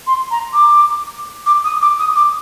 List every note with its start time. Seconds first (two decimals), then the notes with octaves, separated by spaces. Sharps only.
0.07 C6
0.31 A#5
0.53 D6
1.46 D6
1.64 D#6
1.81 D6
1.99 D#6
2.16 D6